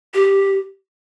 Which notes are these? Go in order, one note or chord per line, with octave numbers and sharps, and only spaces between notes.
G4